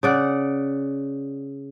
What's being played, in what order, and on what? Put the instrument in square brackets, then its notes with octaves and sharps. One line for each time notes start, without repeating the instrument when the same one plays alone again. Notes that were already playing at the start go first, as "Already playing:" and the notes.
[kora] C#3 D5 F#5